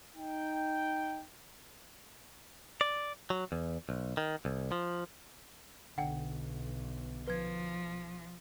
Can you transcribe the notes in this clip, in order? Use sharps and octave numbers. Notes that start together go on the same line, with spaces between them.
D#4 G5
D5
F#3
E2
B1
D#3
C2
F3
B1 D3 F#5 G5
F3 B4 G#6